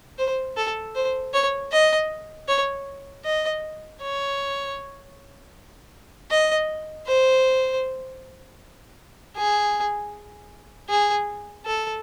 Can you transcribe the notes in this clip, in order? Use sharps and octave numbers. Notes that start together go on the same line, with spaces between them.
C5
A4
C5
C#5
D#5
C#5
D#5
C#5
D#5
C5
G#4
G#4
A4